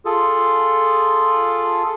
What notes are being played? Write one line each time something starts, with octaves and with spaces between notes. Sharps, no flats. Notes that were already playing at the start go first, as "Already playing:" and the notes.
F4 G#4 A4